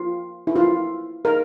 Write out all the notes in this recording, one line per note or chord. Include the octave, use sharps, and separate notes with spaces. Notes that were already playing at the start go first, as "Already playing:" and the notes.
Already playing: F4
E4
F4
A#4